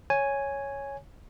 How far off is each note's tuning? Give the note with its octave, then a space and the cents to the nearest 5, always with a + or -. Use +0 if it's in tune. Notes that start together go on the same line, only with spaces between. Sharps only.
C#5 +0 G#5 +0